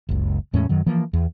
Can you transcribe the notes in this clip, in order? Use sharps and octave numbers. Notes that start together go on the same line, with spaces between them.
F#1 C#2
E2 A2 G#3 C#4
F#2 D#3 F#3
E3 F3 A#3
E2